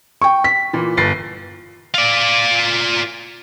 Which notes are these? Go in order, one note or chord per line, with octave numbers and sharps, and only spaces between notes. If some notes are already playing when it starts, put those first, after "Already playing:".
G5 C#6
B6
A#2 E3
G1 A6 C7
F4 D5